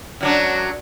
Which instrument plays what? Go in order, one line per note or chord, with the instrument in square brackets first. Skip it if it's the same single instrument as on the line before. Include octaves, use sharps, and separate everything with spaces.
[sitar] F#2 F#3 D4